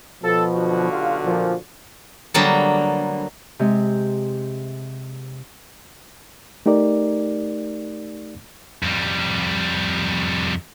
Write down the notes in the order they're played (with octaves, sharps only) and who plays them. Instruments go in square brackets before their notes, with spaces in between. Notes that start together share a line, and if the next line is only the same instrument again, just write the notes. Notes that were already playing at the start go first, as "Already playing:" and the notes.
[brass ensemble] B2 F3 [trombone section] A4
[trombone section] B1 D3 F#4
[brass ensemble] F4 G4 F5
A#2 F3
[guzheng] D3 F#3 G3 A#3 B3
[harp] C3 G#3
[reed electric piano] A3 D#4 G4 A#4 D5
[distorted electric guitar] F2 G3